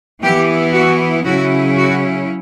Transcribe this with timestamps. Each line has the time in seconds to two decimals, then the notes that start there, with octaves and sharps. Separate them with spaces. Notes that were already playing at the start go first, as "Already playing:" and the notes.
0.22 E3 B3 E4 G4
0.74 F#4
1.25 C#3 F#3 C#4 E4 F#4
1.76 F#4